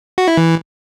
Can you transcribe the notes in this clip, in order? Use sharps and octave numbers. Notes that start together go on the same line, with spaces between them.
F#4
E4
E3